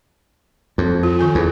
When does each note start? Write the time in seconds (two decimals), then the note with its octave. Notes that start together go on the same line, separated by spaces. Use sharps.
0.78 F2
1.03 F4
1.19 D#3 A4 G#5
1.35 E2